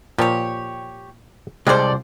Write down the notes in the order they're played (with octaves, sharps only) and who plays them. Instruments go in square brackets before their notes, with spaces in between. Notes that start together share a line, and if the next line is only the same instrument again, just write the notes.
[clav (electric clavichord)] A#2 F3 [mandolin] G4 C#5
[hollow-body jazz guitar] C2 C5 [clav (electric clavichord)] G3 G#3 [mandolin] A4 D5